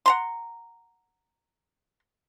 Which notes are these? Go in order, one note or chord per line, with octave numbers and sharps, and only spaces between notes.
F#5 A#5 C6